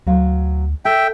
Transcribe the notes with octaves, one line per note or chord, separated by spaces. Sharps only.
D2 F#3 C5 F5
A4 E5 G5